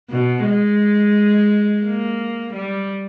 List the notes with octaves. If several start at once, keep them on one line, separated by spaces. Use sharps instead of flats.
B2
G#3
A#3
G3